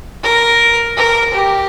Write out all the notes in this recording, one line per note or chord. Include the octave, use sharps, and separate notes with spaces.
A#4
A#4
G4